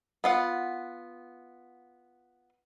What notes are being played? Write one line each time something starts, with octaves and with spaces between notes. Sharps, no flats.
B3 F4 F#5